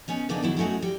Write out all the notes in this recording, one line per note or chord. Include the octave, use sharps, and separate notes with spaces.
B3 C#4 D#4
C#3 A#3 B3 D4 D#4
D#3 F#3 E4
F#3 A3 C#4 D#4 F#4
G3